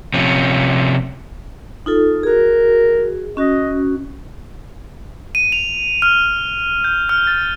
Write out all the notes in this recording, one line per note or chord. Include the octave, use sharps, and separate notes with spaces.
C3 F3 C#4
D#4 F4 A4
F#4 G#4 A#4
C#4 F#4 D#5
D#7
F7
F6
G6
F6
A6